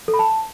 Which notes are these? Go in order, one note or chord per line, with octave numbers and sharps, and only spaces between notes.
A4
B5
A5